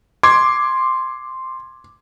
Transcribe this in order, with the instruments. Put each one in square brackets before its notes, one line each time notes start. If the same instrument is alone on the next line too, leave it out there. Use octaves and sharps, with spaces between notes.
[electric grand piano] C6 G#6 [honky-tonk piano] D6